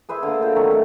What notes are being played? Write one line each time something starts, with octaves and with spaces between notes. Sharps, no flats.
G#4 B4 C5 E5
D3 A#3
F4 G5
D#3 F#3 A3 C4
E3